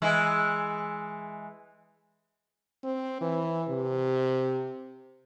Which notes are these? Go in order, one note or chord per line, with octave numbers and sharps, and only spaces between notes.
E3 G#3 E4
C4
E3
C3